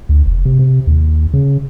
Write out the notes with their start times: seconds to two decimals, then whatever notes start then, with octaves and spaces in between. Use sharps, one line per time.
0.09 D2
0.26 F1
0.45 C3
0.59 C3
0.87 D#2
1.33 C#3